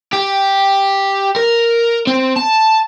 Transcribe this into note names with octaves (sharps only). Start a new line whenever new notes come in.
G4
A#4
C4
A5